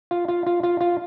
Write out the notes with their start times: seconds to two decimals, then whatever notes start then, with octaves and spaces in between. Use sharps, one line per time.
0.11 F4
0.28 F4
0.47 F4
0.63 F4
0.81 F4